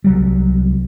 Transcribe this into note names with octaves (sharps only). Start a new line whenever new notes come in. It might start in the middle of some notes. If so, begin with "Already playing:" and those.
C2 F#3 G3